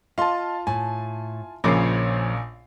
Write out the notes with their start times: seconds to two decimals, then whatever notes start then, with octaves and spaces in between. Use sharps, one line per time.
0.18 F4 D#5 F5 A5 C6
0.67 A2 G#5
1.64 A#1 A#2 C#3 F3 A#3 C#5 D6 C7